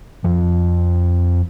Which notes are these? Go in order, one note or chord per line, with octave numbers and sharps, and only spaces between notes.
F2 F3